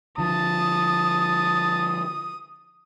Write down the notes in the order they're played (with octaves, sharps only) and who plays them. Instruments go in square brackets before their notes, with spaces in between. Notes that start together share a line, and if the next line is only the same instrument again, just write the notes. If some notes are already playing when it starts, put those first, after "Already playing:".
[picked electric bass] D3 F3 [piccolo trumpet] A5 [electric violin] D#6